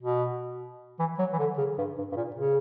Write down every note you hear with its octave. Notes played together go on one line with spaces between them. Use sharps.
B2
E3
F#3
E3
D3
C#3
G2
G2
G2
A#2
C#3